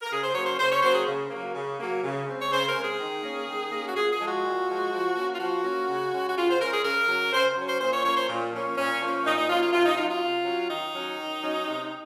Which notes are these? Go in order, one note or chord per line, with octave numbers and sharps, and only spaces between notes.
A#4
C#3 G#4
C5
F#3 A#3 C#4 C#5
C5
C#3 C5
C#5
F#3 A#3 C#4 C5
G#4
C#3
F#3 A#3
C#3
F#3 A#3
C#3
G#3 C4
C#5
C#3 C5
A#4
G#3 C4
G#4
D#3
A#3 C#4
D#3
A#3 C#4
F#4
A#2 G#4
G#4
F3 G#3
F#4
A#2
F3 G#3
F3
A#3 C#4
F4
F3 F#4
A#3 C#4
C#3
G#3 C#4
F#4
C#3 F4
C5
G#3 C#4 A#4
G#4
C#3 A#4
F#3 C#4
C#3 C5
F#3 C#4
C5
A#2 C5
C#5
F3 A#3 C#4 C#5
C5
A#2
F3 A#3 C#4
A#2 C#4
F3 A#3 C#4
A#2 D#4
D#4
F3 A#3 C#4 F4
F4
C3 F4
D#4
F#3 C#4 F4
F4
C3
F#3 C#4
D#3 D#4
F#3 C#4
D#3
F#3 C#4
C3